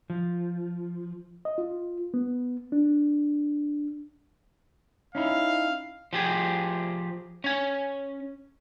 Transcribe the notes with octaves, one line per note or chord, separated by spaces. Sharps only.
F3
D#5
F4
B3
D4
C#4 D#4 E4 F5
F3 G4 G#4
C#4 G#5